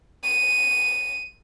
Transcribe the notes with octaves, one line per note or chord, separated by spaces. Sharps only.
D#7